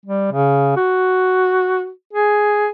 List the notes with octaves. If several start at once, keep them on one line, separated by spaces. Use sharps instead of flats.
G3
C#3
F#4
G#4